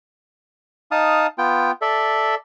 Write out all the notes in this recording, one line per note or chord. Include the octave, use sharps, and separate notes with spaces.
D#4 F5 A5 D#6
B3 F4 G5
A4 D5 E5